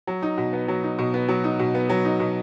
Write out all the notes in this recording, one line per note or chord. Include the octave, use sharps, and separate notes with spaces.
F#3
D#4
B2
B3
F#3
D#4
B2
B3
F#3
D#4
B2
B3
F#3
D#4
B2